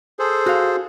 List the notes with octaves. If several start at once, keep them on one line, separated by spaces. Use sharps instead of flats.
G#4 A4 C5
F#4 F5